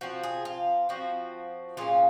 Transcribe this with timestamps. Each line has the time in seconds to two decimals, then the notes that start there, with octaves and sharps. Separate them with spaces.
0.01 F3 C4 F#4
0.23 G#4
0.45 F4
0.89 F3 C4 F#4
1.77 A#2 G#3 C#4 F4